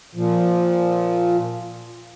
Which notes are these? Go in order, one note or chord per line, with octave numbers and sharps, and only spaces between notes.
A#2 F3